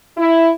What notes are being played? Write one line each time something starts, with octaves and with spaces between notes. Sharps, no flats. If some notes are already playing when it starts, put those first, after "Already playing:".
E4